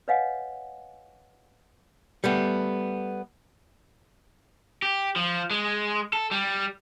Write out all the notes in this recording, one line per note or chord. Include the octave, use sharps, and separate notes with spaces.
B4 C#5 D#5 F5 F#5 G#5
G3 A3 B3
G4
F3
G#3
A4
G3